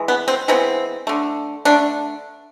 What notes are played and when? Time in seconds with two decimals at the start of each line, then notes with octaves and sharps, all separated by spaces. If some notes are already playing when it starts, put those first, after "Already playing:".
Already playing: E3 G#3
0.08 B3
0.28 C4
0.48 E3 G#3 B3 C4
1.07 D3 A3
1.65 D3 A3 D4